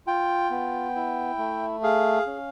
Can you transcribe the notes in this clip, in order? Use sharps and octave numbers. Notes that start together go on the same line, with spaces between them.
F4 G5
B3
E4
A3
G#4 F5
C#4